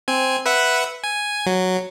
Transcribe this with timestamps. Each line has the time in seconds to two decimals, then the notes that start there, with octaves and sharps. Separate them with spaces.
0.08 C4 G#5
0.46 B4 E5 F#5
1.04 G#5
1.46 F#3